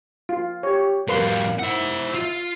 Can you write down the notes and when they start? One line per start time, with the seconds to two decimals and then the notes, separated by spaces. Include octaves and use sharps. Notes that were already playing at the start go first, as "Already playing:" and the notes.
0.29 F4
0.63 G4 C#5
1.09 F2 G3 A#4 B4 F5 C6
1.60 E4 C5 F#5
2.15 F4